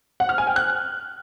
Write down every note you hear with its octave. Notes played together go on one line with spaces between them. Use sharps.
F#5
F6
G#5
G5
F#6